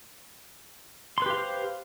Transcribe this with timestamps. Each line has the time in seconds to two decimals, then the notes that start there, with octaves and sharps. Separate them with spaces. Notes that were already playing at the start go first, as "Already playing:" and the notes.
1.18 C6
1.22 B4
1.26 G4
1.30 F5
1.34 C5